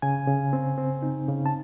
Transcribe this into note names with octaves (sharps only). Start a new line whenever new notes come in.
C#3 G#5
C#3
C4
C4
D#4
C#3
A5